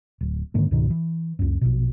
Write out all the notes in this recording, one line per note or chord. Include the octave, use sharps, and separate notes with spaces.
D1
G#2 D3 D#3 A#3
C#2 G#2 B2 D#3
E3
C#2 F#2
A#1 B2